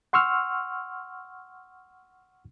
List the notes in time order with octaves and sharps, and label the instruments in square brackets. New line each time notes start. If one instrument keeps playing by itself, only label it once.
[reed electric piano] F#5 C6 C#6 E6 F6